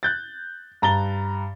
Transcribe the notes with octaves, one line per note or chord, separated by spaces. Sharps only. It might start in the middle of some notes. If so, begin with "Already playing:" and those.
F#6 G6 A6
G2 A#5 A6 G7